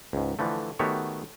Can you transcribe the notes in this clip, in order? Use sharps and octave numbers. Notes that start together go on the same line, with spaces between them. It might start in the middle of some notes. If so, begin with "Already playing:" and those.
C#2 G#2
D3 E3 F3 A3
D#3 A3 B3 F#4 G4 C#5